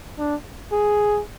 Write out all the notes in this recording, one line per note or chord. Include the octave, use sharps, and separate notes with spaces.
D4
G#4